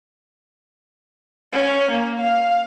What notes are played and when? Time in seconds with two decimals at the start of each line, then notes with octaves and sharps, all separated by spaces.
1.53 C#4
1.91 A#3
2.21 F5